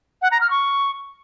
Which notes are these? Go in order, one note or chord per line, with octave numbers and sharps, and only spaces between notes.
F#5
A#5
F6
C#6